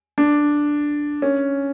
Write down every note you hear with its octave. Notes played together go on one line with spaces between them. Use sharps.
D4
C#4